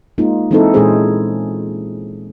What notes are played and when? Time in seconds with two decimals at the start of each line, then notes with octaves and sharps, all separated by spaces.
0.18 G#3 A#3 D#4 F4
0.51 E3 G#3 C4 D#4 E4 A4
0.74 A#2 E3 G#3 C#4 G#4 C5